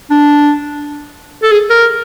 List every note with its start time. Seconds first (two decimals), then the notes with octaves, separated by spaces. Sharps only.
0.10 D4
1.43 A4
1.52 G#4
1.70 A#4